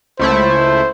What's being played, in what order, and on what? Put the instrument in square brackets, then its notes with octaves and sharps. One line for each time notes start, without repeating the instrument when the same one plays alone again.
[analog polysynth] C#2 A3 E4 [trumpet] C5